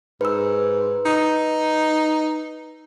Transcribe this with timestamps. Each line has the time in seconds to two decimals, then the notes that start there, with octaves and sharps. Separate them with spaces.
0.21 G#2 B4 E6
1.05 D#4